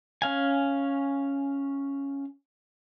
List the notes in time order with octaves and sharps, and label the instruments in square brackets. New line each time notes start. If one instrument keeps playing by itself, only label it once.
[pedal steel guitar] C#4 F5 G#5